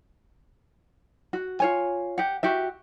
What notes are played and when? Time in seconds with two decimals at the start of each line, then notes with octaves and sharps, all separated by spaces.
1.33 F#4
1.60 F4 C#5 G#5
2.18 G4 F#5
2.43 F#4 G4 E5